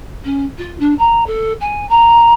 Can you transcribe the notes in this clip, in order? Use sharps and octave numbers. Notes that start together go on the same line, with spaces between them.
C#4
F4
D4
A#5
A4
G#5
A#5